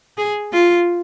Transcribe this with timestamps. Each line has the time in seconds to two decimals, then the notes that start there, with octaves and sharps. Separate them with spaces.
0.18 G#4
0.53 F4